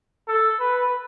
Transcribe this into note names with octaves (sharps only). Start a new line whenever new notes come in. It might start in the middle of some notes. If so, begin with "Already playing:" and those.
A4
B4